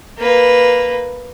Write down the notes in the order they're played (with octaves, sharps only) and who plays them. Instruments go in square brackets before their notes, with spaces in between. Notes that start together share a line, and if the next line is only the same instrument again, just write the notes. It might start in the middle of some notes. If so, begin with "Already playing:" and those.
[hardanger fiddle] A#3 B4